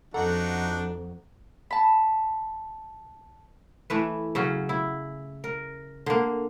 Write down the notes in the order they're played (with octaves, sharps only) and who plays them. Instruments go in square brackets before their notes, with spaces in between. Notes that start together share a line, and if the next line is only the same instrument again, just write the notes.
[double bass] F2 [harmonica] D4 D#4 F#4 [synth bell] A4 F#5 A#5
[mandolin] A5 B5
[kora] E3 A3 B4
C#3 F#3 C#4
E4
A#4
D3 A#3